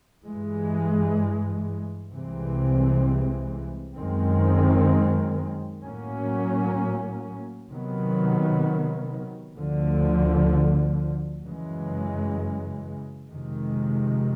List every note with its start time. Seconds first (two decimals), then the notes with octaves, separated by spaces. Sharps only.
0.25 G2 E3 G#3
2.11 C2 C3 E3 G#3 C4
3.97 F#2 D#3 G#3 C4
5.84 A2 F#3 A#3 C#4
7.71 C3 D#3 F#3 B3
9.56 D2 D3 F3
11.43 F#2 C#3 E3 G#3
13.29 F2 C3 D#3 G#3